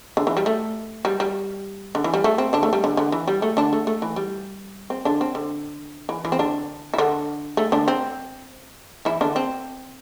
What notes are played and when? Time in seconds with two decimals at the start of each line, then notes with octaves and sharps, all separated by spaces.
0.17 D3
0.27 E3
0.37 G3
0.46 A3
1.05 G3
1.20 G3
1.95 D3
2.04 E3
2.14 G3
2.24 A3
2.38 C4
2.53 D3 D4
2.63 A3
2.73 G3
2.84 D3
2.97 D3
3.12 E3
3.28 G3
3.42 A3
3.57 D3 D4
3.73 A3
3.87 A3
4.02 E3
4.16 G3
4.90 C4
5.05 D3 D4
5.21 C4
5.35 D3
6.09 E3
6.25 E3
6.32 C4
6.39 D3 D4
6.94 E4
6.98 D3 D4
7.57 A3
7.72 D3 D4
7.88 C4
9.05 E3 E4
9.21 D3 D4
9.36 C4